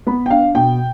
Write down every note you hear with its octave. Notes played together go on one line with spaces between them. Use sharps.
B3 B5
G5
D4 F5
B2 G5